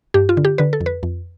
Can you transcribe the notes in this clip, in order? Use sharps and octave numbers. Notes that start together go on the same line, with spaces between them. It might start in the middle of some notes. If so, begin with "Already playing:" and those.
G2 G4
F4
D3
G4
D3 B4
A4
F2
B4
F2